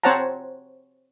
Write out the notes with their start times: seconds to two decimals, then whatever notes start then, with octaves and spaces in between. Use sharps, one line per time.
0.03 C4 C5 C#5 F#5 A5 A#5